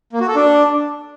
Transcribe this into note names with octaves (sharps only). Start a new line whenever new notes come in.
A#3
F#4
A4
D4